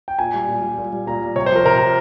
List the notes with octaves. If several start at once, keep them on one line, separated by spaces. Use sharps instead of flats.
G5
A#2 G#5
G3
A#2
G3
A#2
G3
A#2 A#5
G3
C3 C#5
C5
F3 A#4
C3 A#4
F3